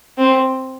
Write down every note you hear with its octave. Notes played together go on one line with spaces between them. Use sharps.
C4